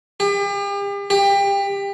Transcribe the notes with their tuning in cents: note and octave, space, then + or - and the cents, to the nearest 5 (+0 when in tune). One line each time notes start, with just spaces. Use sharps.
G4 +40
G4 +25